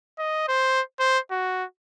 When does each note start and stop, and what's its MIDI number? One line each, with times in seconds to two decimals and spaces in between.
0.19 0.47 75
0.48 0.81 72
1.00 1.19 72
1.31 1.64 66